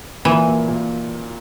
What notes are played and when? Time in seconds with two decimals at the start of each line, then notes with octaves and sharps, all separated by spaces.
0.25 A#2 E3
0.47 A#2
0.68 A#2